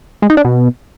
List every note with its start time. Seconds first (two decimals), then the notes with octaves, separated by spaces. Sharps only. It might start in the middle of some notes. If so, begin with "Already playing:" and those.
0.22 G#3
0.30 D#4
0.37 D4
0.45 B2